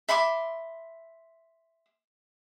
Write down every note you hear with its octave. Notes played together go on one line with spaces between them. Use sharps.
E5 B5 C6 D6